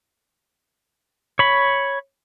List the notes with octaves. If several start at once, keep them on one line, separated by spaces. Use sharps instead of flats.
C#5 B5